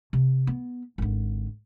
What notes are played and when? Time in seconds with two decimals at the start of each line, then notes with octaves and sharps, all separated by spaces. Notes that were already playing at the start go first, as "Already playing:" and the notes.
0.13 C3
0.47 B3
0.98 G#1 D3